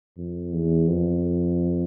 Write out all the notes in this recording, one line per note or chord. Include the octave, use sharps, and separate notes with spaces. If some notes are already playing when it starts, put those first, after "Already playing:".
F2
E2
F2